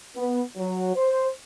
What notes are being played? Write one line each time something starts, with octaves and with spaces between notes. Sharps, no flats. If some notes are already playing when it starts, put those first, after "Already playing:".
B3
F#3
C5